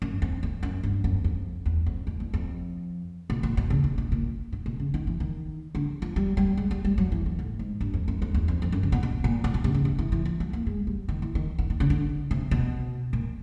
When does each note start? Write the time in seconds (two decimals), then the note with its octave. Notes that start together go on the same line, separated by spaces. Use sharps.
0.02 F#2
0.22 F2
0.43 F2
0.63 F#2
0.83 G2
1.04 F#2
1.24 F2
1.66 E2
1.86 F2
2.07 F2
2.20 E2
2.34 F2
3.30 B2
3.43 A#2
3.57 B2
3.70 C#3
3.84 B2
3.98 B2
4.12 A#2
4.53 B2
4.66 B2
4.80 C#3
4.94 D#3
5.07 E3
5.20 D#3
5.75 D3
6.02 F3
6.16 G3
6.37 G3
6.57 G#3
6.71 G3
6.85 G3
6.98 F#3
7.12 E3
7.26 D#3
7.39 A2
7.59 G#2
7.81 G2
7.94 F2
8.08 F#2
8.22 F2
8.34 E2
8.48 F2
8.62 F2
8.72 F#2
8.83 C3
8.92 B2
9.03 B2
9.24 A#2
9.44 A#2
9.54 B2
9.64 C3
9.74 C#3
9.85 C3
9.99 E3
10.12 E3
10.25 F3
10.40 F#3
10.53 A#3
10.67 G#3
10.87 G3
11.09 D#3
11.22 E3
11.35 D#3
11.59 D#3
11.70 D#3
11.80 C#3
11.90 D3
12.31 C3
12.51 B2
13.13 A#2